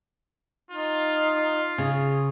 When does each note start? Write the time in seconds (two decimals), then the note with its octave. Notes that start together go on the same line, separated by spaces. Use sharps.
0.71 D#4 F4
1.78 C#3 G#4